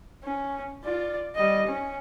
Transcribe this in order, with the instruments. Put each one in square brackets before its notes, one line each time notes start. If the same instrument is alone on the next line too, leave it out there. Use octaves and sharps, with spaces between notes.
[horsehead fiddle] C#4
F4 D5
G3 D#5
C#4